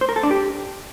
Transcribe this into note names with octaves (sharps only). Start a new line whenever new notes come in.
C5
A#4
A4
D4
G4